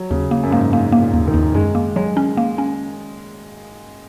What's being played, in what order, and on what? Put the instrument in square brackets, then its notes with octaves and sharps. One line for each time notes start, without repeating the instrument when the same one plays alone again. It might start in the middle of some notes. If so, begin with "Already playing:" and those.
Already playing: [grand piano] F#3
[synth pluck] D#2 [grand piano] C#3
[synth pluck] A#3
[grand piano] F#2
[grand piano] G#2 [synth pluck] A#3
[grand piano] G#2 [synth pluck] A#3
[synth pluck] A#3
[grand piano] A#2
[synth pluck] D#2
[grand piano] D#3
[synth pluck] D#2
[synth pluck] F#2 [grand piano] G#3
[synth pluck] A#3
[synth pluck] F#3 [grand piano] G#3
[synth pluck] C#4
A#3
C#4